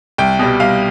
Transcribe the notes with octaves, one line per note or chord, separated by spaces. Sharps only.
C2 G5
B2 G3
C2 F5